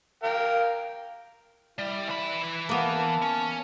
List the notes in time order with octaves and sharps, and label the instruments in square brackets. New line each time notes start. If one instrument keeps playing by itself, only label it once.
[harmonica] A#4 F5 G5
[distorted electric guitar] G3 [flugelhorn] E4
[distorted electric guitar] E3 B5
[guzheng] A#3 B3 [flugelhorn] A5
[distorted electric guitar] C#4